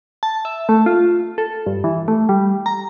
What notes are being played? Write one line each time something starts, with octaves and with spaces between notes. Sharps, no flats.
A5
E5
A3
F4
A4
G2
E3
A3
G3
A#5